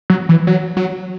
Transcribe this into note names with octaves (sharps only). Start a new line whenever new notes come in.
F#3
E3
F#3
F#3